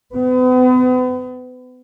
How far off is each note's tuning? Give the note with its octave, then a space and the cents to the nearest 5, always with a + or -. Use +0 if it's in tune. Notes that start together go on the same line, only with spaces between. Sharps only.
B3 +40